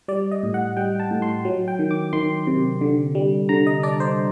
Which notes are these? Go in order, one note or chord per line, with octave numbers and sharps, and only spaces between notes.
G3 D5
D#5
A2
F#5
G3 G5
A5
A2
C6
F#3
G5
D#3
D6
D#3 C6
C3
D3
G3
D3 A#5
D#5
D4 D5
C5